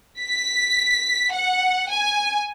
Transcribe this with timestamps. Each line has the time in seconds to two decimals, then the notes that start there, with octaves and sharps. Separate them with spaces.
0.20 B6
1.32 F#5
1.90 G#5